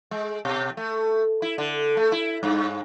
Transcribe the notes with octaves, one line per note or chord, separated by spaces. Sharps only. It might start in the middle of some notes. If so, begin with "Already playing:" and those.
G#3
B2
A3
E4
D3
A3
E4
G2